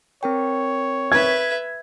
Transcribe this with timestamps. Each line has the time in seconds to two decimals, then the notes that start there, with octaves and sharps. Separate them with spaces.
0.23 C4 A#4 C#5 G5
1.12 B4 E5 G#6